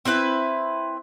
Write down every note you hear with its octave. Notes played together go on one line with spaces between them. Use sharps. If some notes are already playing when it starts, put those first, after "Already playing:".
C4 E4 B4 E5